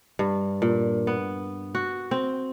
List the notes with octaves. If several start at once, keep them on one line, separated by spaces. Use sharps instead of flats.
G2
A#2
B3
F#4
C4